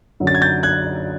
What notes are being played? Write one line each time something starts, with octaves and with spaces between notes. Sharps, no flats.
F#2 D3 F#3
A6
G#6
G6 A6
F#6 G#6